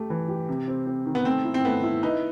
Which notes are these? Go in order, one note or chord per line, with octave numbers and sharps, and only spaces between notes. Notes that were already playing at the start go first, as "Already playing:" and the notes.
Already playing: A3 G4
E3
G4
C3
C4
C4
D#3
B3
A3 C4
E4
C4
A3 B3
E4
D#4 B4